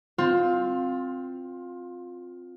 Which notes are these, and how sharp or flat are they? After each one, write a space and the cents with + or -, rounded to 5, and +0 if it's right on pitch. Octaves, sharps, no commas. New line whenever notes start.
C4 +0 F4 +20